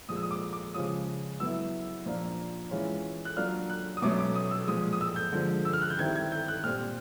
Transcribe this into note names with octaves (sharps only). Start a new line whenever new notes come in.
A#2 F3 G#3 D#6
E6
D#6
D6
D6
C#3 F3 G#3 C#4 F4 D#6
F#3 B3 E4 E6
A#2 F3 A#3 D4 F4
E3 G#3 C#4 F4
F#6
F#3 A#3 D4 F4 F6
F#6
D#6
B2 F#3 A3 C#4 D6
D6
D#6
E6
A#2 F3 G#3 D#6
D#6
E6
G6
D3 F3 G#3
E6
F6
F#6
G6
D#3 G3 C4 E4 G#6
G#6
G6
F#6
A#2 G3 C4 F6